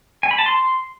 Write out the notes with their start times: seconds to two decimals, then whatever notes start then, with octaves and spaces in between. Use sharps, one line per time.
0.23 G#5
0.31 B5
0.39 A5
0.46 C6